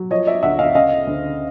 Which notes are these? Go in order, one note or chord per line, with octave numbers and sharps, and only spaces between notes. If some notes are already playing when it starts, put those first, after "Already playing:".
Already playing: F#3
F3 C#5 D#5
D5 E5
D2 E5 F#5
D#5 F5
C#3 D#5 F5
D2